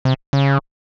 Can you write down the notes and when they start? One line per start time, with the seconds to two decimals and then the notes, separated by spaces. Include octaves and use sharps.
0.05 C3
0.33 C#3